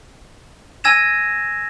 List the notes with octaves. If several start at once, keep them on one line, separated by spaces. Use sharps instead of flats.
G#5 E6 G#6 A#6 E7